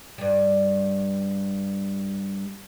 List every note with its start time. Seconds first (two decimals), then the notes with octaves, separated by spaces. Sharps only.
0.18 G2 G3